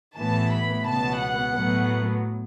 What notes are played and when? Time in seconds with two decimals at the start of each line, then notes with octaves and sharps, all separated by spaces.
0.16 A1 A2 E3 B3 A5
0.51 B5
0.84 C#2 B2 B3 A5
1.19 F#5
1.54 A2 F#3 B3